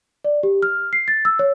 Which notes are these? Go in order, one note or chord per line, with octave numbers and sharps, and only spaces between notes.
D5
G4
F6
C7
A6
E6
C#5